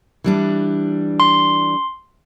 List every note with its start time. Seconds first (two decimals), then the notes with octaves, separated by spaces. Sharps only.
0.24 E3 G3 D4
1.20 C6